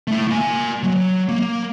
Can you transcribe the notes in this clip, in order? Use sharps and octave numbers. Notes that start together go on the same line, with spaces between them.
A3 E4
A#3 G#5
F#3
A#3